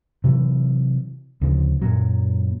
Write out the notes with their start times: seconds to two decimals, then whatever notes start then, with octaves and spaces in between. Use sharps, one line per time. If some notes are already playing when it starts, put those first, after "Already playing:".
0.24 C3 E3 F#3
1.41 D2 C#3 E3 F3
1.81 F#2 A#2 F#3